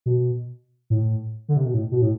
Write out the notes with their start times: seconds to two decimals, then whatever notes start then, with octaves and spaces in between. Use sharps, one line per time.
0.06 B2
0.90 A2
1.48 D3
1.57 C3
1.66 B2
1.74 A2
1.92 B2
2.02 A2